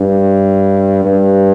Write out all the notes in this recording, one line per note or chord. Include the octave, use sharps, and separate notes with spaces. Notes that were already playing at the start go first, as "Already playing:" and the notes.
Already playing: G2
G2